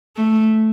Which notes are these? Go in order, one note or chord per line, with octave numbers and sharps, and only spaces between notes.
A3